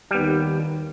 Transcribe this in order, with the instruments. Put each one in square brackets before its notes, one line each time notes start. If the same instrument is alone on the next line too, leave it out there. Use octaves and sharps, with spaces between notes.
[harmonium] D#2 [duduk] D#3 [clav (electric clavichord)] G3 B3